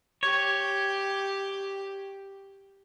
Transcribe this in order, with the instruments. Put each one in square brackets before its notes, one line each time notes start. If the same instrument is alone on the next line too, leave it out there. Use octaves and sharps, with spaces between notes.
[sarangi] G4 [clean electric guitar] C#5